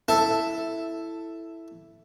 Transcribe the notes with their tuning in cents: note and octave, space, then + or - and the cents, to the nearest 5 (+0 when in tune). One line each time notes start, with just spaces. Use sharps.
E4 +0 A4 +5